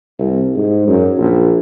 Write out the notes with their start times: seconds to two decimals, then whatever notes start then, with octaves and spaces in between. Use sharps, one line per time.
0.19 C2
0.55 G#2
0.88 F#2
1.18 A#1